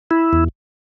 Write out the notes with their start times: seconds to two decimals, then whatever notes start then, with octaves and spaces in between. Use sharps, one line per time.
0.11 E4
0.33 E2